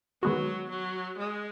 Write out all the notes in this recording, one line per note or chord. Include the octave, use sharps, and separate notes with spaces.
D#3 F#3 G#3 B3 F#4
F#3
G#3